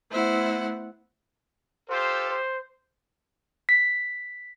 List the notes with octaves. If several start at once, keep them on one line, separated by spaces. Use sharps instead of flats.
A3 B3 E4 C5 F#5
F4 G4 A4 C5
C5
B6